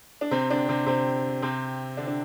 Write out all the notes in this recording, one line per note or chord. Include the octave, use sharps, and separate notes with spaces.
D4
C3 C4
D3 D4
C3 C4
C3 C4
C3 C4
D3 D4
D4